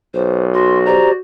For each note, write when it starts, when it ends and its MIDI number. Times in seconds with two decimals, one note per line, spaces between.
0.14 1.01 35
0.14 0.44 72
0.54 1.21 66
0.54 0.79 84
0.86 1.12 67
0.86 1.12 72
0.86 1.12 74
0.86 1.09 82